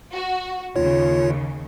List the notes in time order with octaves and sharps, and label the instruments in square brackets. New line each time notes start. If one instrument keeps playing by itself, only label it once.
[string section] F#4
[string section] D#2 C#3 [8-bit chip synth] F4 C#5